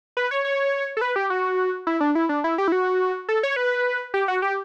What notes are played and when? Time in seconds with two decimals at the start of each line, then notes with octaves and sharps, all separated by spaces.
0.17 B4
0.31 C#5
0.45 C#5
0.97 A4
1.01 B4
1.16 G4
1.30 F#4
1.87 E4
2.00 D4
2.15 E4
2.29 D4
2.44 E4
2.58 G4
2.68 E4
2.72 F#4
3.29 A4
3.43 C#5
3.56 B4
4.14 G4
4.28 F#4
4.42 G4